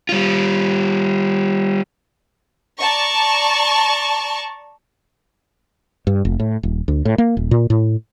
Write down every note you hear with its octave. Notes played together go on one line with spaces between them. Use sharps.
G3 F4
D5 A5 A#5 C#6
G2
F1
A2
D#1
D2
A2
A#3
D#1
A#2
A2